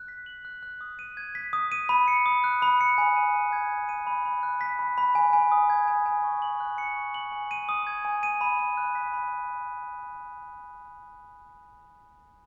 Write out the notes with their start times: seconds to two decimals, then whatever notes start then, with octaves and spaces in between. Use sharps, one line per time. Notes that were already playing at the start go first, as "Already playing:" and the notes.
Already playing: F#6
0.08 B6
0.26 F#7
0.45 F#6
0.63 F#6
0.81 D#6
0.99 D#7
1.17 G#6
1.35 B6
1.53 D#6
1.72 D#7
1.89 B5
2.08 C#7
2.26 D#6
2.44 F#6
2.62 B5
2.81 C#7
2.98 G#5
3.16 D#7
3.34 B5
3.53 G#6
3.71 G#5
3.89 D#7
4.07 B5
4.25 B5
4.43 F#6
4.61 B6
4.79 B5
4.98 B5
5.15 G#5
5.33 G#5
5.52 D#6
5.70 G#6
5.88 G#5
6.06 G#5
6.24 C#6
6.42 F#7
6.60 F#6
6.78 C#7
6.96 C#6
7.14 F#7
7.32 G#5
7.51 D#7
7.69 D#6
7.87 G#6
8.05 G#5
8.23 D#7
8.41 B5
8.59 D#7
8.77 F#6
8.95 B6
9.14 B5